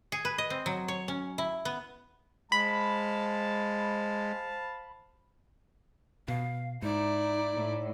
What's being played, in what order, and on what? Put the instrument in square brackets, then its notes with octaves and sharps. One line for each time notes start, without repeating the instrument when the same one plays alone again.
[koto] G#4
B4
D#5
C4
F#3
C#5
C#4
E4
B3
[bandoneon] G#3 [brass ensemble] C5 F5 A5 [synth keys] B5
[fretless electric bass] B2 [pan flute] F5
[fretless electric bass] G#2 [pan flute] D#4 [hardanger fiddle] E4 D5
[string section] A2